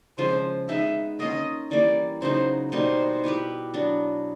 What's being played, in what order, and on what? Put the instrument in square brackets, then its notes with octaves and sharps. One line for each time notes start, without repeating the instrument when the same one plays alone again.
[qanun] C#3 F3 G#3 [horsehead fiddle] C5
[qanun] G#3 B3 D#4 [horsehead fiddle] E5
[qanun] A#3 C#4 F4 [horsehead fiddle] D#5
[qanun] E3 G3 A#3 [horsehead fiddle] D5
[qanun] C#3 F#3 B3 D#4 [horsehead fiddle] C5
[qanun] B2 G3 A#3 D#4 [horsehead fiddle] C5
[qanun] B3 E4 G4 B4
F#3 B3 D4